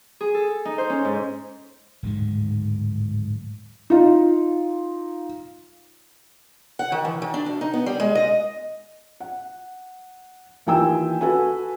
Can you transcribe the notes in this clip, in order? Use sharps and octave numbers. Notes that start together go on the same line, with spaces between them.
G#4
A4
D#4
C5
C#4
G#2
D1 G#2 D#3
D#4 F4
F#5
D#3
E3
D#3
D4
D2
D#4
B3
G3
G#3
D#5
F#5
D#2 E3 F4 G5 G#5 E6
F#4 A4 B4 G#5